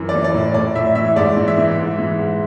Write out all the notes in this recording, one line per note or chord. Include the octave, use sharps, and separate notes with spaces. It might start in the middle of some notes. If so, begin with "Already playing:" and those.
Already playing: F#2 E3
D5
E3
D5
A2
A2 D5
A2 E5
E3 E5
G#2 D5
E3
E5
E3
G#2
E3
G#2